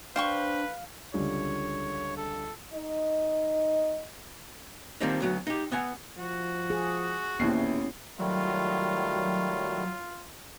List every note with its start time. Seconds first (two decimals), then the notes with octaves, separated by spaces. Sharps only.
0.16 D4 B4 C5 F5 G5 C#6
1.14 C#2 D3 G3 C#5
2.17 A4
2.74 D#4 D#5
5.01 D#3 F3 G3 A#3 C4 D#4
5.20 D2 F#3 B3
5.47 D#4 G4
5.72 B3 F#5 G#5
6.18 F3 F#4
6.70 G#4
7.40 A#1 D#2 B3 C#4 E4 C7
8.19 D#3 F#3 G3 A3 F4